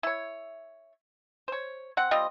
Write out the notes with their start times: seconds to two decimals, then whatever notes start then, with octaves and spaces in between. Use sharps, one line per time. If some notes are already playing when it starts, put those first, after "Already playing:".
0.03 E4 C#5
1.48 C5 C#5
1.97 C4 F#5
2.11 G3 C4 F4 D#5